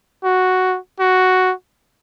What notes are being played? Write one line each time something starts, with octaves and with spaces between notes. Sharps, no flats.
F#4
F#4